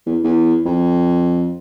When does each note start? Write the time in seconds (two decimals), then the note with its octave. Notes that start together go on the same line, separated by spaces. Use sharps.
0.06 E2
0.24 E2
0.65 F2